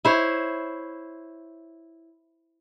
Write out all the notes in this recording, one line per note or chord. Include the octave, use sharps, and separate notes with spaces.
E4 C5 C#5